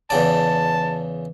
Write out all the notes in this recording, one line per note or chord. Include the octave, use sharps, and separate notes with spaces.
E2 C#3 D5 A5